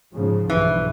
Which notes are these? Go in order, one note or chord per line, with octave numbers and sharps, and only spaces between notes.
G#2 C#3 F3
B1 G2 E3